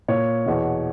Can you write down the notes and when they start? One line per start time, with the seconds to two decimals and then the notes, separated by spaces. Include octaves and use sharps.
0.08 A#2 C#5
0.46 E2 B2